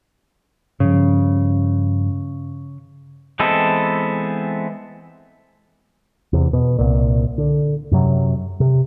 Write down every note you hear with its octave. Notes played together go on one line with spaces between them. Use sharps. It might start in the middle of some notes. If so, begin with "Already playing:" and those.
G2 C#3 F3
E3 G#3 B3 C4 A4
E2 C3
B2
C2 A#2
D3
F#2 C3 F#3
C3